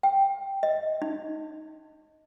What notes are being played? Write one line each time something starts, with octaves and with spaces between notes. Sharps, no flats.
G5
D#5
D#4